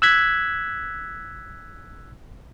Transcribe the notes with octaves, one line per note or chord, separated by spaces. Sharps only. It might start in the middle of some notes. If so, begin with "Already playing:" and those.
E6 F#6 G#6 B6